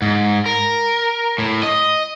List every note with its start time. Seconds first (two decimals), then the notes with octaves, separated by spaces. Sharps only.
0.02 G#2
0.46 A#4
1.38 A2
1.63 D#5